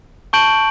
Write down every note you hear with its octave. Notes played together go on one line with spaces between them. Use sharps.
A5 C#6 G6 D7 F#7